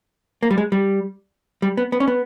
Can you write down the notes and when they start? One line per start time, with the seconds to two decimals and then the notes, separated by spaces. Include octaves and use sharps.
0.43 A#3
0.51 G3
0.58 G#3
0.72 G3
1.62 G3
1.77 B3
1.92 B3
2.00 C#4
2.08 B3